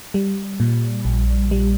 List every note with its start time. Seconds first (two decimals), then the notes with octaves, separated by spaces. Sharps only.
0.14 G3
0.60 A#2
1.05 A#1
1.51 G3